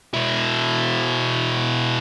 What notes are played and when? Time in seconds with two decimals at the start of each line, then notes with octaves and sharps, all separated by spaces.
0.14 B2 E4